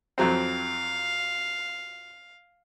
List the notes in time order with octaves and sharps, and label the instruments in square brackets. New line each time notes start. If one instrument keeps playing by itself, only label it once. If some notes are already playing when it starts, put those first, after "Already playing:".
[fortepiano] F2 F#3 C4 [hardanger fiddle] F5